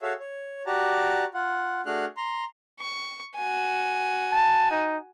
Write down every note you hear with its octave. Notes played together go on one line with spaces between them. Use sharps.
F#4 G#4 A4 C#5 E5 F5
C#5
F#4 G4 D5 A5 A#5
F4 F#5
A3 D4 F#4 G#4 F6 F#6
A#5 C6
C#6
F#4 G#5
A5
D#4